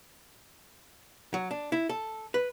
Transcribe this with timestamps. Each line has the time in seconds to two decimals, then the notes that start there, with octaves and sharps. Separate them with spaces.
1.34 F#3
1.51 D4
1.72 E4
1.89 A4
2.34 B4